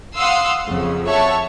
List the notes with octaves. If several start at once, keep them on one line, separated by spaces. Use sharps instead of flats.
F5 F#5 C6 D#6 E6 C7
F2 C#3
C#5 E5 F#5 A5 C#6